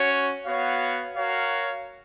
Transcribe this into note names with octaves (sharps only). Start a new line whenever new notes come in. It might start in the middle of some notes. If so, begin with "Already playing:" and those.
Already playing: C#4 F#4 C#5
B3 F#4 C#5 F5
F#4 A#4 C#5 F5